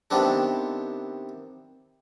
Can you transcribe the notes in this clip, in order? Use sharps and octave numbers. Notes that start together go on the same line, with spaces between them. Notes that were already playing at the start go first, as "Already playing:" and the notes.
C3 D#3 B3 C4 D4 A4